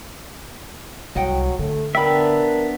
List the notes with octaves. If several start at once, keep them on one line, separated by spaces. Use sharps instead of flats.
C2 F#3 D#5 F#5 G5
D3 A3
B3 D4 A#4 E5 G5 B5